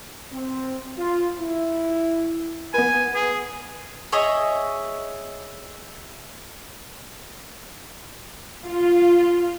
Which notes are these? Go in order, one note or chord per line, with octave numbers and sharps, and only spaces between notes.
C4
F4
E4
B3 B4 G#5
G#4
G#4 C#5 D#5 E5
F4